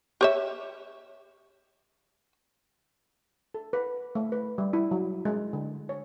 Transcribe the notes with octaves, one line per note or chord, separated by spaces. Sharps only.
G4 C#5 E5
A4
B4
A3
B4
G3
E4
F#3
G#3
D3
C#5